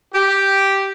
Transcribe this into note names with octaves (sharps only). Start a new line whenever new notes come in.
G4